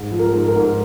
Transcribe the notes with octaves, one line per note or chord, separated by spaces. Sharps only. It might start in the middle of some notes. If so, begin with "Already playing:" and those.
Already playing: G#2
F3
A#4
G#2
A#4
G#2